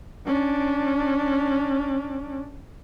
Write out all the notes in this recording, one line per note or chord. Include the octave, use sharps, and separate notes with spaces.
C#4 D4